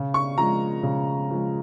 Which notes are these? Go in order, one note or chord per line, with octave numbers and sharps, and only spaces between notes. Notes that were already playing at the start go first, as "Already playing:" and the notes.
Already playing: C#3
C#6
F3 G#3 A#5
C#3
F3 G#3